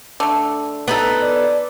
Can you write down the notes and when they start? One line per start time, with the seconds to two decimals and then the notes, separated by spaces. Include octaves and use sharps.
0.20 D3 A3
0.88 B3 D#4 A4
1.22 D5